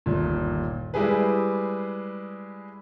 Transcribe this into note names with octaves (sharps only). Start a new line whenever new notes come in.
G1 D#2 A#2
G3 G#3 E4 G4 G#4 B4